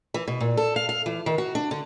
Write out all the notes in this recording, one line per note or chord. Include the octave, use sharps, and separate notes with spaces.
E3
B2
A#2
A4
F5
F5
E3
D#3
F#4
D4
D3